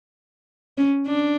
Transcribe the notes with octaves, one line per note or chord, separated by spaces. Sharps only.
C#4
D4